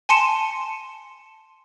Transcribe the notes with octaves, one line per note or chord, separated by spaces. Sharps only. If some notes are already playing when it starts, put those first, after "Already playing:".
G#5 A5 C6 C#7 E7